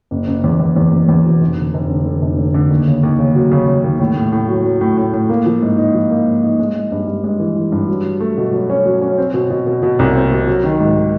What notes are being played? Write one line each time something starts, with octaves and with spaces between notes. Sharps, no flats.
F#1
F#1
E2
E2
E2
F#1
E2
B2
F1
D3
F1
D3
D3
F1
D3
D3
D#2
C#3
D#2
C#3
F#3
C#3
C#3
D#2
A2
A2
A2
F#3
F#3
A2
A2
A2
A#3
F3
G#2
D#4
F3
A#3
G#2
D#4
G#3
G#3
G2
G2
G#3
E3
E3
G2
F#3
F#3
A3
B2
F#3
C#4
F#3
C#4
C4
B2
B2
B2
B2
C2
C4
B2
F#3
D#3
G#2